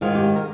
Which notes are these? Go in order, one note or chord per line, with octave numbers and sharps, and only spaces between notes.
G#2 D#3 G#3 F4
G4
A#4